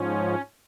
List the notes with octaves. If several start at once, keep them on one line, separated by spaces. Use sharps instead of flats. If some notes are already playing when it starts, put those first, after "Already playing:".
Already playing: G#2 F3 C#4